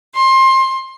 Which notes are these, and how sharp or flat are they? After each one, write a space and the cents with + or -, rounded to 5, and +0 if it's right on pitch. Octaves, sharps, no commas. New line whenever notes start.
C6 +20